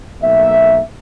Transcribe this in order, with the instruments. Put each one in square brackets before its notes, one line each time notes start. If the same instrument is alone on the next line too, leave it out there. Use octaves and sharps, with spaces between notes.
[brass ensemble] B1 A3 A#3 E5